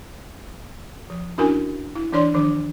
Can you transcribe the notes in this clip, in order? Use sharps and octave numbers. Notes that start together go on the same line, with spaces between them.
F3
C#4 D4 E4 F#4 A#4 G#5
E4
E3 D4 C#5 D5 C6
D#3 F3 D4